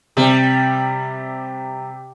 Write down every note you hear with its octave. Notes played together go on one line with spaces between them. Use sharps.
C3 G3